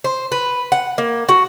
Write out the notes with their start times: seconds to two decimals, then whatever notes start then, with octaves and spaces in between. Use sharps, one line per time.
0.04 C5
0.32 B4
0.72 F#5
0.98 A#3
1.29 F#4